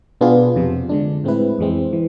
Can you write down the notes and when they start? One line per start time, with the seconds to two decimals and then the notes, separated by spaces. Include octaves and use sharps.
0.21 B2 B3 D4 F4 G#4
0.55 F2 C3 F3
0.89 D3 G#3 D4
1.24 A2 G#3 C4 E4 B4
1.59 F2 E3 G#3 C4
1.93 E3